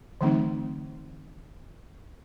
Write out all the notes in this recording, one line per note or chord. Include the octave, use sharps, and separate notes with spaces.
D3 E3 F#3 A3 C4 D#4